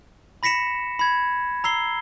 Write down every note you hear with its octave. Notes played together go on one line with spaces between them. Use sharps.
B5 A#6 B6 C#7 E7
B5 G#6
A#5 E6 C7 G7